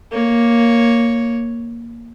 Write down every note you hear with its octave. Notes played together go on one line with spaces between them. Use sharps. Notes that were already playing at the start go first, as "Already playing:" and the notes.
A#3 C#5